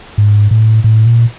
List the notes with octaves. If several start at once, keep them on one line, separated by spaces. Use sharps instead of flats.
G#2
A2
A2
A#2